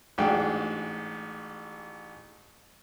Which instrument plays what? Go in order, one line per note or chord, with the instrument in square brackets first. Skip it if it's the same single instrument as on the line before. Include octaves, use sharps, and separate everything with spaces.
[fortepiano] A1 G#2 D4 F#4 G#4 G5